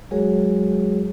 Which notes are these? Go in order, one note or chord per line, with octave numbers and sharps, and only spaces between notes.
F#3 G#3 F#4 G#4 A#4 C#5